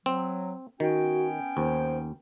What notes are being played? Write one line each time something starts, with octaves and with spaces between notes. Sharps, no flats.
F#3 C4
D#3 B3 C#4 F#4 G5
D#2 C5